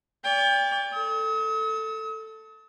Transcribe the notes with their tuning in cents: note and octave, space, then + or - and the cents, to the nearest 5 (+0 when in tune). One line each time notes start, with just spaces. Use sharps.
D5 -35 G5 +35
A4 +10 D#6 +45